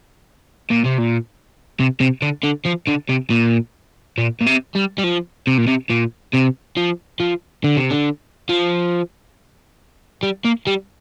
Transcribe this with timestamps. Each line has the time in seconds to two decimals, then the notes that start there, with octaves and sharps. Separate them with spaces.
0.71 A#2
0.85 C3
0.99 A#2
1.80 C3
2.00 C3
2.22 D3
2.44 D3
2.66 F3
2.88 D3
3.09 C3
3.30 A#2
4.18 A#2
4.41 A#2
4.46 C3
4.75 G3
4.98 G3
5.04 F3
5.47 C3
5.58 A#2
5.68 C3
5.90 A#2
6.34 C3
6.77 F3
7.20 F3
7.64 D3
7.77 C3
7.91 D3
8.49 F3
10.23 G3
10.45 A#3
10.67 G3